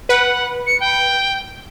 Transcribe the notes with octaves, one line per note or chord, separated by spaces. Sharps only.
B4 F#5
C#7
G5